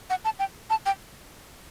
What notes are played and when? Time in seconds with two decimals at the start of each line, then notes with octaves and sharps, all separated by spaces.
0.10 F#5
0.25 A5
0.39 G5
0.70 A5
0.86 G5